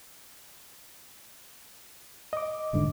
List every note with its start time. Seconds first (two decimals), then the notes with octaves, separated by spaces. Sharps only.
2.33 D#5 D6
2.73 E1 G#2 D3